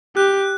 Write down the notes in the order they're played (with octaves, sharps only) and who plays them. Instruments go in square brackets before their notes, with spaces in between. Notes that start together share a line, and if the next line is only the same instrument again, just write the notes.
[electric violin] G4 [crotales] F#6